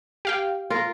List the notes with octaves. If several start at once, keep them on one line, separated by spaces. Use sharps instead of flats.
G4 F5 G5
F4 A#4